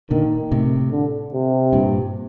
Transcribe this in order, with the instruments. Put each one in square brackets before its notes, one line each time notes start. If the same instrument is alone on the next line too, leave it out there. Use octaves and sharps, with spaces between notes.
[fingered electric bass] A#2 D3 [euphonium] D#3
[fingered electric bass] A2 C3
[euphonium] D3
C3
[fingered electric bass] G2 A#2